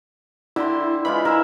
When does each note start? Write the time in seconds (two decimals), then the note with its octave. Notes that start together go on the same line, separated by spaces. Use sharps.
0.56 D3 E4 G5 C6
1.05 E3 G#3 F4 B5
1.25 E4 A#4 E5